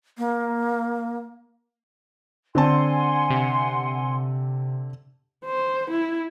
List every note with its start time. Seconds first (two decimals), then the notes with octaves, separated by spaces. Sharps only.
0.18 A#3
2.55 D3 C4 F#5 G#5 A5 C6
3.30 C3
5.46 C5
5.90 E4